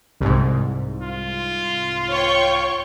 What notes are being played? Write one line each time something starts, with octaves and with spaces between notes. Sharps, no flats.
C2 G#2
F4
C#5 G5 C#6